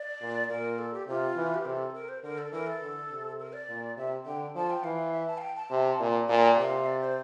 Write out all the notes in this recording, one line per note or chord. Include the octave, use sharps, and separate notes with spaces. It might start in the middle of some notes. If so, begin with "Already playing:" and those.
Already playing: D5
A#2
A#2 A#4
A4
G4
C3 F4
E3
G4
C3 A4 A#4
A#4
C5
D3 A#4
A4
E3 A#4
A4
D3
C3
A#4
D5
A#2
C3 E5
D3 G5
F3 A5
G5
E3 F5
E5
A5
F5
G5
A5
C3
A#2
A#2 A5
G5
C3 F5
D5
C5